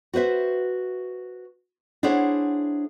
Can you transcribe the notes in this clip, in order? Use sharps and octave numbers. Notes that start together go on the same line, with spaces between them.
F#4 B4 C5 E5
D4 E4 G#4 C5 C#5 F#5